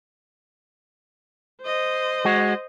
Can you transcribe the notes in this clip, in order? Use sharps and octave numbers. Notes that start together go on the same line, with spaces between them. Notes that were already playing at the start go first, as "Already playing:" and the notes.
C5 D#5
G#3 F#4